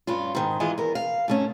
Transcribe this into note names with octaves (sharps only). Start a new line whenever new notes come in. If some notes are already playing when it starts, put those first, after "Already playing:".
G2 C#4 F4
G#2 D#3
E3 G#3 F4 G#4 D#5
E2 A#4
F5
G#2 A3 C#4